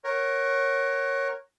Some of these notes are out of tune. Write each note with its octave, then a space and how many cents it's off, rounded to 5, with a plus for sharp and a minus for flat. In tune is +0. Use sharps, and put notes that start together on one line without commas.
A#4 +5 C#5 -10 F#5 +20